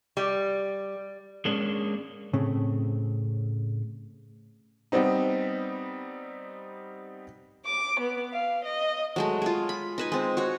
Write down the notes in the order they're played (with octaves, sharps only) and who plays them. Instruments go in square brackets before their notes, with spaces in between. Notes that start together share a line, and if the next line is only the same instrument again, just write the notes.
[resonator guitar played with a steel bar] G3
[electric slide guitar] G#3 A#3 C#4 D4
[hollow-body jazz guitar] A2 C#3 A3 C4
[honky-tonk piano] G3 B3 C4 D#4
[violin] D6
B3
F5
D#5
[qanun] F#3 G#3 A3
F4 G#4
B5
D#4 B4 G#5
G#3 C4
F#4 C#5